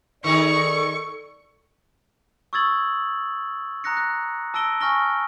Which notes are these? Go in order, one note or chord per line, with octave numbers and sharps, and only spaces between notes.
D#3 D#4 G#4 A4 D5 C#6
C#6 D#6 E6 G#6 A6 F#7
A#5 D#6 F#6 A#6 C#7
F#6
A5 E6 A#6 D7 G7
G#5 C#6 F6 A#6 G7